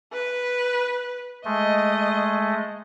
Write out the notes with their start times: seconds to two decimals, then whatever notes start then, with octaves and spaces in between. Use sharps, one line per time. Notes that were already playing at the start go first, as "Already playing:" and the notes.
0.13 B4
1.45 G#3 A3 D#5